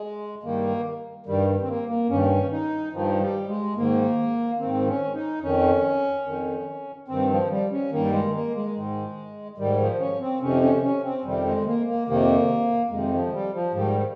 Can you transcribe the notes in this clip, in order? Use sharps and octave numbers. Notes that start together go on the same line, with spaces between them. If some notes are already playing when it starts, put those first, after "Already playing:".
Already playing: G#3
G2 D#3 A#3
G2 D#3 G3
C4
A#3
A#3
G2 D#3 C#4
D#4
G2 D#3 F3
G3
G#3
G#2 D#3 A#3
G#2 D#3 C4
C#4
D#4
F2 D#3 C#4
F2 D#3
G2 D#3 C4
F3
G3
C#4
G2 D#3 A#3
G#3
A#3
G#3
G#2 D#3
G#2 D#3 G3
F3
C#4
C4
F2 C3 D#3 C#4
C#4
C#4
C4
F2 C3 D#3 G3
G#3
A#3
A#3
F2 C3 D#3 A#3
F2 C3 D#3 G#3
F3
G3
F3
G#2 D#3 G3